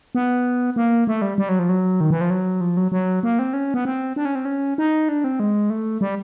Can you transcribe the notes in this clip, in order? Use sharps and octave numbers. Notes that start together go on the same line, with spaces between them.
B3
A#3
A3
G3
G3
F#3
F3
F#3
D#3
E3
F3
F#3
F3
F#3
F#3
A#3
C4
C#4
B3
C4
D4
C#4
C4
C#4
D#4
D4
C4
G#3
A3
G3